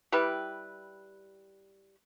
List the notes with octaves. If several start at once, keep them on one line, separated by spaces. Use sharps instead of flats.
G3 E4 G4 B4